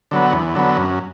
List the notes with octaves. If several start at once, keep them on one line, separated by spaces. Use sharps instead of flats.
D3 F#3 B3
E2
D3 F#3 B3
F#2